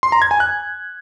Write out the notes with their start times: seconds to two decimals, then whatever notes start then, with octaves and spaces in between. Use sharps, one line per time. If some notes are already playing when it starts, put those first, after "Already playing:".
0.03 C6
0.12 A#5
0.22 G#6
0.31 G#5
0.40 F#6